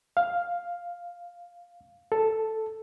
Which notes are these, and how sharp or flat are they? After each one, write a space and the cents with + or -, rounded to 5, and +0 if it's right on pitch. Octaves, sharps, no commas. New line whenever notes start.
F5 +5
A4 +0